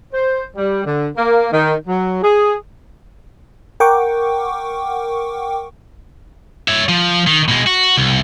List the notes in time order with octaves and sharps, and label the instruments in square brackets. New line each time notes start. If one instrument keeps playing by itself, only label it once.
[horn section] C5
G3
D3
A#3
D#3
F#3
G#4
[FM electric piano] A#4 F#5 G5 C#6 D6
[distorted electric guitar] C#5 E5
F3
D#3
B2 G#3
F#4
C2